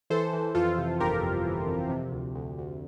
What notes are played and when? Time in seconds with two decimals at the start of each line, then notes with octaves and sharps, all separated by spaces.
0.10 E3 A4 C5
0.33 E3
0.55 F2 F4 A4
0.78 C3
1.00 G1 G4 A#4
1.22 F2
1.45 E3
1.67 F2
1.89 C3
2.12 D2
2.35 D2
2.58 D2